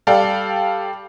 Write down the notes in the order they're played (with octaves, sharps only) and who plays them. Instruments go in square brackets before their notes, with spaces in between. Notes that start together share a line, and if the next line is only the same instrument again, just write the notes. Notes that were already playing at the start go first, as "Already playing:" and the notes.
[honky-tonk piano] G3 A4 D5 F5 G5